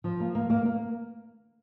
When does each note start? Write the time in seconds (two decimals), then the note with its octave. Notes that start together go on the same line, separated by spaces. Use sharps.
0.04 F3
0.20 A#3
0.35 A#3
0.50 A#3
0.65 A#3